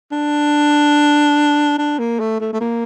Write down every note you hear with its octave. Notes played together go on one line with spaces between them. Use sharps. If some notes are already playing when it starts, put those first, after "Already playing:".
D4
D4
A#3
A3
A3
A3
A#3